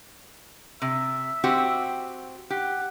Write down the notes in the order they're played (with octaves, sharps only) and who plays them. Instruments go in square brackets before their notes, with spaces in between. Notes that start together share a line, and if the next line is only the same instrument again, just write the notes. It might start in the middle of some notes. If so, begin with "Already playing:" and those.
[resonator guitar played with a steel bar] C3 [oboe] E5
[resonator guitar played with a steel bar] C4 F#4 G4
[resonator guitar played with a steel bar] G4 [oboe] F#5